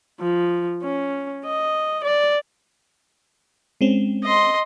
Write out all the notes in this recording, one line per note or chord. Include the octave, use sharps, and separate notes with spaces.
F3
C#4
D#5
D5
G#3 C4 C#4
D#5 C6